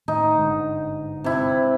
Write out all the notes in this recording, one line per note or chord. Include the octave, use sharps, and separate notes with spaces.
A2 D#3 D#4
G1 G#2 D3
C3 E4